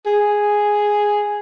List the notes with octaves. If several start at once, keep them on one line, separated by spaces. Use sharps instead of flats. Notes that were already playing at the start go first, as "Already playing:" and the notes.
G#4